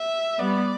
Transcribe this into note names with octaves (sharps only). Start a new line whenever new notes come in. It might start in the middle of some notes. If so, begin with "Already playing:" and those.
Already playing: E5
G3 B3 D5